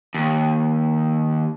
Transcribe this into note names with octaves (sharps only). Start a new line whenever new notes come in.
D#2